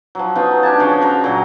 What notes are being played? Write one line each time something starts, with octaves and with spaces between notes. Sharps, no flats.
F3 F#3
B3 C#4 D#4 F4
D4 G4 G#5 A5
C#3 F3 C#4 G5
F#4 A#4 G5
A#2 F#3